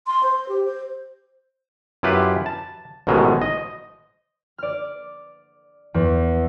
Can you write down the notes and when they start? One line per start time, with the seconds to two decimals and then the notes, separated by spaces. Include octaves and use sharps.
0.07 C6
0.23 C5
0.49 G4
0.65 C5
2.03 F#2 E4 F4 G4 B4
2.46 A5
3.07 A1 G#2 B2 D#3 E3 G#3
3.42 D#5
4.58 D5 F6
5.94 E2